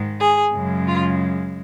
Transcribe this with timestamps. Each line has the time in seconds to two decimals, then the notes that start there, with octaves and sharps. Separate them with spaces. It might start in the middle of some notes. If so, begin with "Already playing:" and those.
Already playing: G#2 D#3 G#3
0.20 G#4
0.54 F#2 C#3 G#3
0.87 F4